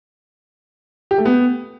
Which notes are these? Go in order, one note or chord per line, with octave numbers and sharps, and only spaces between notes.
G4
A3
B3